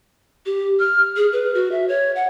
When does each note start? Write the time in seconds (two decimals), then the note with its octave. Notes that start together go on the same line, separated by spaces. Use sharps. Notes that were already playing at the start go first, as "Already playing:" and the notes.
0.46 G4
0.80 F6
1.16 G#4
1.33 B4
1.54 F#4
1.72 E5
1.88 C#5
2.16 F#5